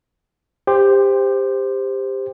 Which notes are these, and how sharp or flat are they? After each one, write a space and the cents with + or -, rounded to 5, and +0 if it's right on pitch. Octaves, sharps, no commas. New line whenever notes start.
G4 +20 C5 -5